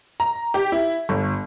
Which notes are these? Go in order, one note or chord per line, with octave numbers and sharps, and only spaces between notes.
A#5
G4
E4
G1